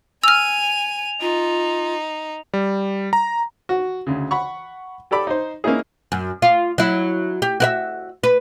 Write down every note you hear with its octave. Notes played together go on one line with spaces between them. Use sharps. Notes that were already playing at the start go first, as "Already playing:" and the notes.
G#5 E6 F6 D#7 F7
D#4 F4
G3
A#5
F#4
D2 C#3
F#5 B5 C#6
G4 A4 D5 B5 D6
D#4 C5
A#3 C#4 D#4 E4 G#4
F#2
F4
F#3 E4
G4
F#4 A#4 E5
B4